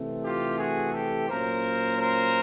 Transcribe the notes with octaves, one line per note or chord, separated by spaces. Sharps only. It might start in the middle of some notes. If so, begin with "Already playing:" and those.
Already playing: C3 E3 A3 C4
F4 G4
F#4 G#4
G4 A4
A#2 F#3 A#3 C#4 A#4 C5
A#4 C5